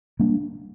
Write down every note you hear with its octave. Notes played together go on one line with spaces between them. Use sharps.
G3 A#3 D4